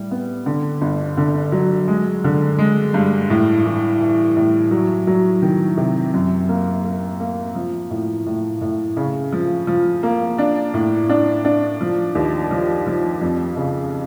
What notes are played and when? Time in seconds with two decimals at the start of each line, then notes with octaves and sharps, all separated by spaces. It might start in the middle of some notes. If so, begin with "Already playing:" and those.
Already playing: A2 G3
0.11 B3
0.46 D3
0.82 G1
1.17 D3
1.52 F#3
1.88 G#3
2.24 D3
2.59 G#3
2.94 G2
3.30 A2
3.65 E3
4.01 E3
4.37 A2
4.71 F#3
5.07 F#3
5.42 D#3
5.77 C3
6.14 F#2
6.49 A#3
6.85 A#3
7.20 A#3
7.55 F3
7.91 A2
8.26 A2
8.61 A2
8.97 C#3
9.33 F3
9.67 F3
10.03 A#3
10.38 D4
10.74 A2
11.09 D4
11.45 D4
11.81 F3
12.15 D#2
12.51 F3
12.86 F3
13.21 F2
13.57 C#3